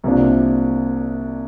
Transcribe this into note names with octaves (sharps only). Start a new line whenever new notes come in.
C2 C3 F3 A#3 D4